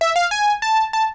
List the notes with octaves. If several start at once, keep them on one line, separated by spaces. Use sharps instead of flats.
E5
F5
G#5
A5
A5